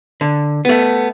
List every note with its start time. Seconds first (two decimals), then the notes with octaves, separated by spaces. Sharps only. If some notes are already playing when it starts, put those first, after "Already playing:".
0.21 D3
0.65 A3 B3